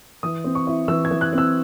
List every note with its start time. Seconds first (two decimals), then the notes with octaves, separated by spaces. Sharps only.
0.23 E3 D#6
0.44 C4
0.55 C#6
0.67 E4
0.88 E3 E6
1.05 G#6
1.11 E3
1.21 F#6
1.33 C4 E6